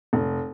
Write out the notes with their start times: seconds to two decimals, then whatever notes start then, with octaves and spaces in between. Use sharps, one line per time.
0.13 F1